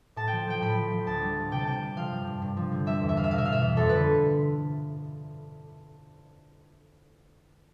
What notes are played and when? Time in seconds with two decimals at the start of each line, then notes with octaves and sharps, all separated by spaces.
0.16 A2 A5
0.27 F3 G5
0.47 F3 G5
0.61 A2 B5
0.77 F3
0.92 F3
1.07 D2 A5
1.22 G3
1.36 G3
1.51 C3 G5
1.59 A5
1.67 C3 G5
1.82 C3
1.97 F3 F5
2.11 G2
2.27 G2
2.42 G2
2.57 F3
2.72 D3
2.86 G3 E5
3.02 E2
3.09 E5
3.16 E2 F5
3.24 E5
3.31 B2 F5
3.38 E5
3.45 B2 F5
3.52 E5
3.62 E2
3.77 F2 A4
3.89 D3 B4